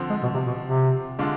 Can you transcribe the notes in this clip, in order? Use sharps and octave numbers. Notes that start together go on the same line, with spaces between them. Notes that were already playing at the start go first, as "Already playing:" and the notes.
Already playing: D3 F3 C4
G#3
B2
C3
B2
C3
D3 G#3 D4 F4